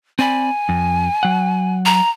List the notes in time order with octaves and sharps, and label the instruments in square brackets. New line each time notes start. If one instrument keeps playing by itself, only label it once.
[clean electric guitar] C4 D5 B5 [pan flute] G#5
[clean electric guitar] F2
F#3 F#5
[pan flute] A#5